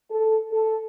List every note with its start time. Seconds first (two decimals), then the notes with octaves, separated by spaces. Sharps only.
0.10 A4
0.51 A4